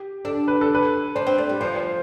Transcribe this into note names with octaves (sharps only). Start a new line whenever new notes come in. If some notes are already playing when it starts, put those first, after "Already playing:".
Already playing: G4
D4 A4
B4
A4
B4
D4 C5
C4
A3 D5
G3
F3 C5
C5